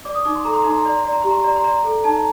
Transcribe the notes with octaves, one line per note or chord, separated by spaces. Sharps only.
D5 D6
D#6
D#4 D6
C6
A4 A#5
C6
D#4 A#5
C6
A#5
D5 C6
A#5
D5 C6
A#5
G4 C6
A#5
C6
D5 A#5
C6
D5 A#5
A4
D#4 A5
A#5